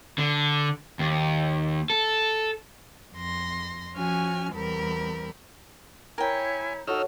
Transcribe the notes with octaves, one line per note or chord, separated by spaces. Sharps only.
D3
D#2
A4
F2 C6 A#6
F3 C#4 F#4 G#5 F6
E2 G3 C4 A#4 B5
E4 A#4 C#5 G5 G#5
D#4 F#4 A4 C#5 E6 F6